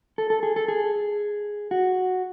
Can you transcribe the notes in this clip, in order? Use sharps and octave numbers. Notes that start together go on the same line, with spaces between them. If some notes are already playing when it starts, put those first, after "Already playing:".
A4
A4
G#4
A4
G#4
F#4